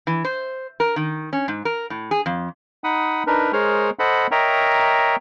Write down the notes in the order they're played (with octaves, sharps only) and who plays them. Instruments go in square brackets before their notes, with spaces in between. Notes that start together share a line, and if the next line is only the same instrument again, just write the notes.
[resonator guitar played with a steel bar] E3
C5
A#4
D#3
C#4
G#2
A#4
A2
G#4
F2
[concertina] D#4 F#5 B5 D#6
D4 D#4 A#4 B4
G#3 G#4 A#4 C5 C#5 F6
A4 C5 D#5 F#5 B5
A#4 C#5 D#5 E5 G5 A#5